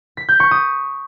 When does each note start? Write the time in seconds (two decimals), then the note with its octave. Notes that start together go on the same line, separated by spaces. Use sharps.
0.17 B6
0.29 G6
0.40 C#6
0.51 D#6